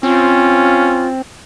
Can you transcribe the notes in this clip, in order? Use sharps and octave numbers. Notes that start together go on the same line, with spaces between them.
C4 C#4 F4